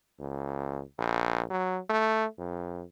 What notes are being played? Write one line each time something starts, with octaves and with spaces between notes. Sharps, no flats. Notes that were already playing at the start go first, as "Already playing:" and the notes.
C#2
A#1
F#3
A3
F2